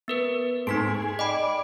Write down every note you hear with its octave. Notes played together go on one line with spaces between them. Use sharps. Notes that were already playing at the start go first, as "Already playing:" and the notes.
B3 A#4 B4
G#2 A3 C4 D#4 B6 D7
G#4
D5 D#5 G5 B5